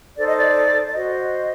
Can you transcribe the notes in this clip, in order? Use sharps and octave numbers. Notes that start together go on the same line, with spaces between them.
D#4 A4 C5 D5
D#5
D5
D5
F#4 C5 D#5